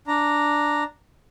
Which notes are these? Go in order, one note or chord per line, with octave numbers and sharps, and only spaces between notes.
D4 A#5